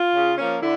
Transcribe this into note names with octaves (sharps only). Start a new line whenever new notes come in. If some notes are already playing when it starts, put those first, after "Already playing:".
Already playing: F4
C#3
F3 A#3 C#4
D3 E4